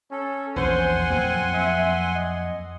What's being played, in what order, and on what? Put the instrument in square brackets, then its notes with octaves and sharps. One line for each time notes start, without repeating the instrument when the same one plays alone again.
[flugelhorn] C#4 [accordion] A4
[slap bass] A#1 E2 [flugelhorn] C5 [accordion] F#5 G#5 C6
[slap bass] F2 F#3 A#3 [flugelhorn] C4
[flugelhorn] E5
D#5